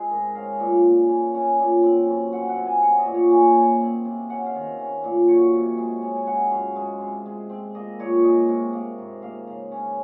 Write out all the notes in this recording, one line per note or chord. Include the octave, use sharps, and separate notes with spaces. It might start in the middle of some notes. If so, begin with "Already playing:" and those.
Already playing: G#3 C4 G#4 C5
G#2 A#4
C#4 F5
A#2
A#3
C#4
C#4 G#5
A#2
C4
F#2
C4 F#5
F#5
C3
G#5
C#4 F#5
D#5
A#2
C#5
A#3 G#5
C#4
C4
C3
C#4 F#5
F5
D#3
C5
C#4
A#2
F#3 C#5
C3
G#3
C#4
G#5
G#3 F#5
F#2 F5
G#3
C3
G#3
C4
A#3 D#5
A#2 C#5
G#3 D#5
C3
A#3
G#2
A#3 F5
C#3
C#4